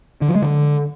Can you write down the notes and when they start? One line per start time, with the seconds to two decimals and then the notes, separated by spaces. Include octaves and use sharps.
0.22 D3
0.29 F3
0.35 G#3
0.42 D3